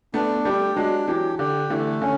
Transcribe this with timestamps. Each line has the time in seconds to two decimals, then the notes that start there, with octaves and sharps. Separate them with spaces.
0.14 A3 B3 D4
0.45 G3 A3 G4
0.76 F#3 G#3 D4
1.08 E3 F#3 G4
1.39 D3 G4
1.70 D3 E3 A3
2.02 D3 C#4